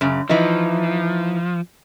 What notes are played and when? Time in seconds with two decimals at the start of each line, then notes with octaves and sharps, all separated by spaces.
0.01 F#2 C#3
0.30 E3 F3 D#4